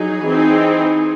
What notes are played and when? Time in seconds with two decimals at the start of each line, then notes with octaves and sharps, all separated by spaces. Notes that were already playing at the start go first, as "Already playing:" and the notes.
Already playing: F#3 D#4 G#4
0.26 E3 C4 D#4